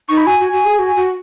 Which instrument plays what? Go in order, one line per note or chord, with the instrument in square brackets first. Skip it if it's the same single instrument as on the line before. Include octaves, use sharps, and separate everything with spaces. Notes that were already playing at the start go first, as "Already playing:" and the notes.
[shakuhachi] D#4 [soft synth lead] C#6
[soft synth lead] B5
[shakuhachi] F#4 [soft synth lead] G#5
[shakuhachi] F#4
F#4
G#4
F#4
F#4